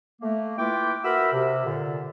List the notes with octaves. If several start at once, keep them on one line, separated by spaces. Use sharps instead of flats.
A3 A#3
E4 F4 B4 G5 D6
F#4 A#4 B4 E5 B5 E6
C3
A#2 D3